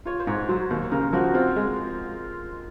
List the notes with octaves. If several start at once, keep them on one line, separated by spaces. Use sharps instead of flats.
F4 C#5
C5
G#2 C#5
F#3 C5
D#2 C5
C#3 A#4
F3 F#4
C4 F4
G#3